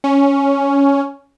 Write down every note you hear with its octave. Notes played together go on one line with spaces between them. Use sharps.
C#4